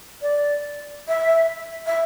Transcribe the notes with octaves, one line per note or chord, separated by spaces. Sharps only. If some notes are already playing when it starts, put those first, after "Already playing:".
D5
E5
E5